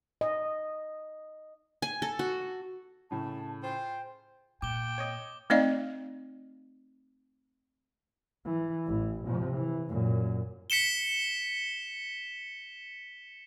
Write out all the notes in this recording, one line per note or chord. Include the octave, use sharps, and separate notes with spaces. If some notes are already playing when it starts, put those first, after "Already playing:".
D#5
G#5
A4
F#4
A2 C#3 A5
F4 G#4 C5 G5
A#2 G5 D6 G7
C#5 D#5
A3 C4 D#4 D5 D#5 F5
E3
A1 E3
C3 F3
E3
F#2 A#2
B6 C#7 E7 G7